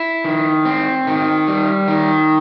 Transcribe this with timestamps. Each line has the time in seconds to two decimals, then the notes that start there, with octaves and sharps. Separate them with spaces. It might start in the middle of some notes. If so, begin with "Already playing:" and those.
Already playing: E4
0.25 D#3
0.65 C4
1.07 D#3
1.48 G3
1.88 D#3